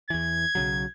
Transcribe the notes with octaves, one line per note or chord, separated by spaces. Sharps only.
E2 E3 G#6
B1 C#3 F#3